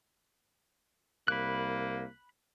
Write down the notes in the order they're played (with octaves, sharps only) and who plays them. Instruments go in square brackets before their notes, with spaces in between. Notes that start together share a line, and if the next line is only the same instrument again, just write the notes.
[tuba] C2 [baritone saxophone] A#3 [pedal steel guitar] B5 F#6